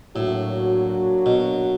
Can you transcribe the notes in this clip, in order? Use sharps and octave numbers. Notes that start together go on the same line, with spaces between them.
A2 F#3 A#3 D4 F#4
B2